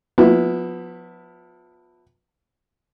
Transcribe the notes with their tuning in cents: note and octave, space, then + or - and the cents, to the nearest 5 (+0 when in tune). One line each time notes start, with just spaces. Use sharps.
F3 +35 B3 +0 E4 +0